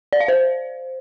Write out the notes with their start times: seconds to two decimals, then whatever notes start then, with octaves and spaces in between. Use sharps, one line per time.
0.13 D5
0.20 F5
0.28 C5